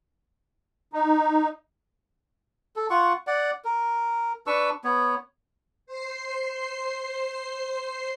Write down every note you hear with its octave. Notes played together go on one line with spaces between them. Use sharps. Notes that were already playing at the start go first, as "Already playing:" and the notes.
D#4
A4
F4 F#5 C#6
D5 F#5
A#4
D4 B4 C#6 E6
B3 C#5
C5 C7